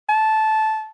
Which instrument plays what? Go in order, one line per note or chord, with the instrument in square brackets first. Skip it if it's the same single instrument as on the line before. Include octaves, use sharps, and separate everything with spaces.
[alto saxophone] A5